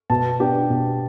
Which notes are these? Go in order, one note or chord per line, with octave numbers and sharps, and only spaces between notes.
B2 A5
B3 D4 G4
B2